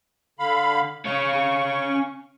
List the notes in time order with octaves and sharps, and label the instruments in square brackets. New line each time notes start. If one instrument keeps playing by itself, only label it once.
[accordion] D3 F5 B5
[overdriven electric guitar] C#4 F5 [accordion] C#6